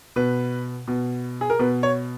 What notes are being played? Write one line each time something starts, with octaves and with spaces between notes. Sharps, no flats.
B2 B4
B2
G#4
A#4
B2 B4
C#5